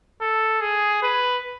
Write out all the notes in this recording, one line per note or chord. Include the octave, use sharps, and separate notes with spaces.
A4
G#4
B4